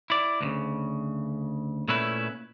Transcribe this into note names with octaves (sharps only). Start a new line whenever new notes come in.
E4 D5
D2 A#2 C#3
A#2 A3 C#4 E4 B4